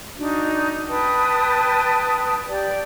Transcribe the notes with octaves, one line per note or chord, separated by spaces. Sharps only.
D4 D#4 F#4
B4 G5 A5 D#6
G4 D5 G5